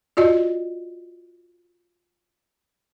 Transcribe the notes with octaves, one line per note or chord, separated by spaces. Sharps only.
F4 F#4 D5 D#5